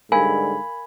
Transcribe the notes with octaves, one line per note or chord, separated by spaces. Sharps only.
G#2 D3 G3 A#4 F5 G#5 B5 G#6